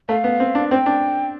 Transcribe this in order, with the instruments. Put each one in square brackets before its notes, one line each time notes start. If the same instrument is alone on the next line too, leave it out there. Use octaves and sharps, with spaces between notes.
[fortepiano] A3 [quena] F5
[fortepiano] B3
C4
D4
[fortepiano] C4 [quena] G5
[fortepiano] D4